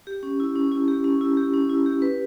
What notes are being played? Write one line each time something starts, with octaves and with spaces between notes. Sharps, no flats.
G4
C#4
E4
C#4
E4
G4
C#4
E4
G4
C#4
E4
G4
B4